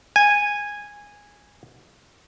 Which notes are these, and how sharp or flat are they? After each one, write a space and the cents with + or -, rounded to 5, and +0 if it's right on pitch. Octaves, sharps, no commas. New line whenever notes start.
G#5 -10